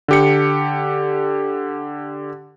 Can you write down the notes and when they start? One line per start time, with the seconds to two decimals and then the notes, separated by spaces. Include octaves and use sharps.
0.08 D3 G4 C#7